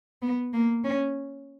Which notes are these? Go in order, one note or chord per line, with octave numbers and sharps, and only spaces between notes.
B3
A#3
C#4